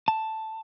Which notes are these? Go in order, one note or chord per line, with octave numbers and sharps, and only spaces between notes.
A5